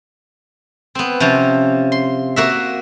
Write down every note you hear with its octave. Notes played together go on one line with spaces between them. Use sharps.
B3 C4
C3 F3 C#4
C6
A#3 F#4 E5